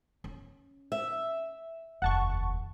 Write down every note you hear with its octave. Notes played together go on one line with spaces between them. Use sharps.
C#4
E5
F1 D#2 F#5 A5 C#6